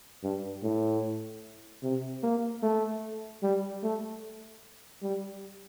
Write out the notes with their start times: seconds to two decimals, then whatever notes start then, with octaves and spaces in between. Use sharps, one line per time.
0.23 G2
0.63 A2
1.83 C3
2.23 A#3
2.63 A3
3.43 G3
3.83 A3
5.02 G3